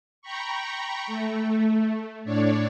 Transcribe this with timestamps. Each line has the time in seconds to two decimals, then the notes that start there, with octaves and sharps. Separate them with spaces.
0.22 G5 A#5 B5 C#6
1.07 A3
2.24 A2 D4 C#5 D5